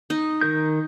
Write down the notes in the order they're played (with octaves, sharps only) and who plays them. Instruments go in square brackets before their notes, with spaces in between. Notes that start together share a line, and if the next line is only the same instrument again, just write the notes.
[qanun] D#4
[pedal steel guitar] D#3 A#4 G6